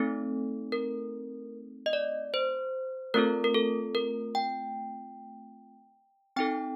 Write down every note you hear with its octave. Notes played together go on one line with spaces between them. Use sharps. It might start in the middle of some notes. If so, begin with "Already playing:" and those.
Already playing: A3 C4 D#4 A4
A#4
D#5
D5
C5
A3 C4 F4 A4 A#4
A#4
A4
A#4
G5
C4 D#4 A4 G5